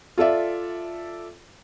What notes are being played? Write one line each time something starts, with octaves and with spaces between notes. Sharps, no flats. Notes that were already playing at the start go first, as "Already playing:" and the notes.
F4 A4 D5 E5